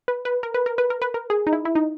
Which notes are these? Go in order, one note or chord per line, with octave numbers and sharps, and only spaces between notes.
B4
B4
A#4
B4
A#4
B4
A#4
B4
A#4
G#4
D#4
E4
E4
D#4